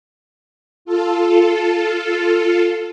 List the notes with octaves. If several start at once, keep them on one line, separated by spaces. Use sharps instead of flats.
F4 A4